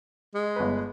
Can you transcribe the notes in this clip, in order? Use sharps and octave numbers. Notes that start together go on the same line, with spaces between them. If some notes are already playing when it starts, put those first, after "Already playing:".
G#3
G1 B4